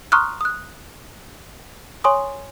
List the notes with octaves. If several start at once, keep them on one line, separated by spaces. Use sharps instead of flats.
A#5 C6 C#6 D#6 F6 F#6
D#6 F#6
C#5 G#5 C6 C#6 D#6